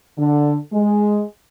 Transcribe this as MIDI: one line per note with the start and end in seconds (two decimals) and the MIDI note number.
0.19 0.56 50
0.73 1.23 56